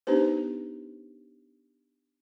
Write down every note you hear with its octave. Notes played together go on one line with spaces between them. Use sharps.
B3 D4 D#4 G4 B4 C5